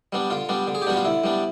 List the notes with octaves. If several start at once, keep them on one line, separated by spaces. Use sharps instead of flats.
G3 B3 D4
D3 F4
G3 B3 D4
D3
G#4
G4
G3 B3 D4 F#4
F4
D3 E4
G3 B3 D4